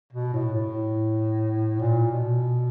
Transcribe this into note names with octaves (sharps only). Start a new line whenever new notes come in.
B2
A2
A2
A#2
B2